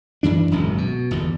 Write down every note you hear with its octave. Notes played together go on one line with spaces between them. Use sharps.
F#2 E3 D4
D#1 G#1 C#2 F#2
B2
G1 E2